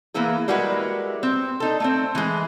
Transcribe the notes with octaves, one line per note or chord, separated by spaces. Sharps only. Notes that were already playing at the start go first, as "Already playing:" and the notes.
E3 A#3 B3 E4 G#4
G3 G#3 E4 F#4 A#4 B4
C4
D4 D#4 A4
A3 A#3 C4
E3 G#3